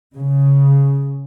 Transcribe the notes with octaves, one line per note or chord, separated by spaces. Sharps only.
C#3